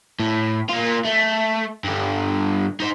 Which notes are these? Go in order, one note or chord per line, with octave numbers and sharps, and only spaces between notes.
A2
A#3 F4
A3
G2 D3
D#4 C5